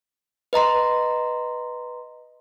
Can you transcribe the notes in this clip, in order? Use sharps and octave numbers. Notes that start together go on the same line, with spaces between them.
B4 D#5 A#5 C6